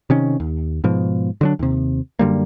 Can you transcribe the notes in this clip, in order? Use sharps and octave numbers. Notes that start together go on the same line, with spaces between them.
C3 D#3 C#4
D#2
G#2 B2 F3
D3 F#3 D4
D#2 C3
F#2 D3 G3 A#3